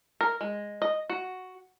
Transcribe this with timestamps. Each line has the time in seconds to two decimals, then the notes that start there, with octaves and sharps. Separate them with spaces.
0.21 A#4
0.41 G#3
0.82 D#5
1.09 F#4